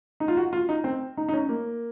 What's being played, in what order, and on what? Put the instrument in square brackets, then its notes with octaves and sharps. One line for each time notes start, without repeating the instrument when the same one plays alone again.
[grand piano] D#4
F4
F#4
F4
D#4
C4
D#4
D#4
C#4
A#3